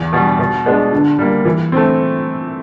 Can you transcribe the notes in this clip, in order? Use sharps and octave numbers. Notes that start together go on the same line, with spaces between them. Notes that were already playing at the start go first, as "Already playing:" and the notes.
Already playing: E2
B2 G3
B2
G#3 B3 D4
D3
G3 A#3
E3
A3 C4